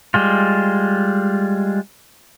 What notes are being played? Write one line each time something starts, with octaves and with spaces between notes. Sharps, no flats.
G3 G#3 F4